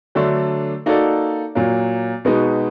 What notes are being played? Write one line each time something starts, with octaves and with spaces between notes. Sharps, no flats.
D3 F#3 A3 D4
A#3 D#4 F#4 A4 D5
A#2 F#3 A#3
B2 G#3 B3 D#4 F#4